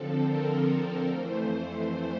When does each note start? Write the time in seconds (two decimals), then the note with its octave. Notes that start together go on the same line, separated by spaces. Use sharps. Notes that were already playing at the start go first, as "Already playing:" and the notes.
Already playing: D3 F3 C4 A4
0.25 A#4
1.08 F2 E3 A3 C5